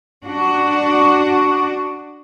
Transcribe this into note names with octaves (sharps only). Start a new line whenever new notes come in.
D4 F#4